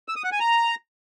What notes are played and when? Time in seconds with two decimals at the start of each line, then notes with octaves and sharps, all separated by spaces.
0.08 E6
0.16 D#6
0.24 F#5
0.32 G#5
0.40 A#5